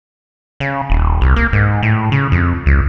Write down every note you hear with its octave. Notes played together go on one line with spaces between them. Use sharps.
C#3
D#1
C2
A#3
G#2
A2
C#3
F2
C#2